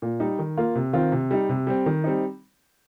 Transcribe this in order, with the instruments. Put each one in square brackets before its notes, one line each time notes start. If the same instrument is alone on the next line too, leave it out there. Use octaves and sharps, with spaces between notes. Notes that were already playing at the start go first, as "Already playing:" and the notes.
[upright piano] A#2
G3 D#4
D#3
A#3 F4
C3
D#3 C4 F4
C3
G3 D#4
C3
G3 C4
D#3
G3 C4 D#4